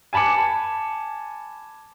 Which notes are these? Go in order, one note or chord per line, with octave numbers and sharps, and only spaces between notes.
G#5 A5 B5 D6 C#7